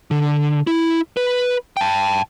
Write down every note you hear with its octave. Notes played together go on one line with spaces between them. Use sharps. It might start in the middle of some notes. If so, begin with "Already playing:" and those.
D3
E4
B4
G5 A5